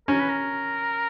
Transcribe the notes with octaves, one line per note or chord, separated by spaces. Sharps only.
C#4 A#4
B4
A#4